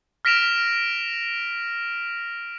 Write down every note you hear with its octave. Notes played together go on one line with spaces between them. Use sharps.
F6 A#6 B6 D7 E7 F7